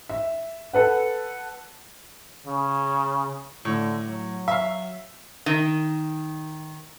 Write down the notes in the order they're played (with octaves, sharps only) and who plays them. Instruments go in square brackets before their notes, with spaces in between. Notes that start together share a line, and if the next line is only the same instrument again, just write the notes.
[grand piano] E5
A4 B4 F#5
[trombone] C#3
[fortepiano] A2 [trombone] D3
[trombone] F#3
[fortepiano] E5 F5
[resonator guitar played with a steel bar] D#3